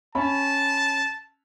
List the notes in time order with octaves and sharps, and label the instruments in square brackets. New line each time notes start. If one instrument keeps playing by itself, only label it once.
[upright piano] C#4 B5 [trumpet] A5